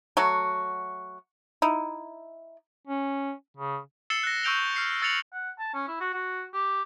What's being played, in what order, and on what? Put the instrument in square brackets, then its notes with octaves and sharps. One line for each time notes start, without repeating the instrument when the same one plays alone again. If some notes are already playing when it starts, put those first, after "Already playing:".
[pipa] F#3 A3 F#4
D#4 E4
[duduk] C#4
C#3
[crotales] E6 A6 C7 C#7 E7 G7
F#6 A#6
C#6 E6 G6 D7 F7 G7
F6 C7 C#7
E6 A6 C#7 F7 F#7
[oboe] F#5
A5
C#4
E4
F#4
F#4
G4